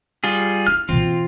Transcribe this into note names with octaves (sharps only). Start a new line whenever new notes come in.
G3 F4 G#4
E4 F6
B2 E3 C4 F4